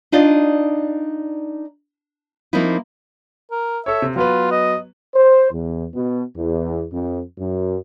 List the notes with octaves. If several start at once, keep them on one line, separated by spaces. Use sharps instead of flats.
D4 D#4 F4 D5 D#5
F3 A#3 C4 D#4 E4
A#4
A4 C#5 E5
C3
F#3 B3 F4 B4
D#5
C5
E2
B2
E2
F2
F#2